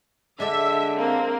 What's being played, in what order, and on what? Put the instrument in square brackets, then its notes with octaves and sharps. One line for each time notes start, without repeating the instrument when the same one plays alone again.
[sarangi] D3 [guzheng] G#3 D4 D5 [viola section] E5
[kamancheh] A#3 [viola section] C4